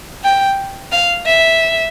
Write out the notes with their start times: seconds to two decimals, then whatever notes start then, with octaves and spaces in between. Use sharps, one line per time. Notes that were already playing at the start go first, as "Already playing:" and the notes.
0.24 G5
0.92 F5
1.26 E5